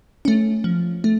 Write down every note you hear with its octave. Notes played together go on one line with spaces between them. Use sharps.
A3 C#4
F3
A3